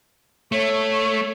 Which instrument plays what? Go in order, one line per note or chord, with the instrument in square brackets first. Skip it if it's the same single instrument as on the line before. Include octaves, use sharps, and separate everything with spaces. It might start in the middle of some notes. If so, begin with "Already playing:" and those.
[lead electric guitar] A3 [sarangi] C#5